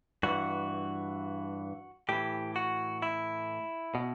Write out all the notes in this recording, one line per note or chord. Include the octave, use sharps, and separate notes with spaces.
G2 E3 F#4
A2 E3 G4
F#4
E4
B2